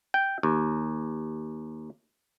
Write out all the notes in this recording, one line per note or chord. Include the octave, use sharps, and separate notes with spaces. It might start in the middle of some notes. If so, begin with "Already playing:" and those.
G5
D#2